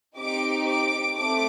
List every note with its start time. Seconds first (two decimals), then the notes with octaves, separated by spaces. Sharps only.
0.17 C4 D#4 G4 D6
0.67 D6
1.17 A3 C4 D6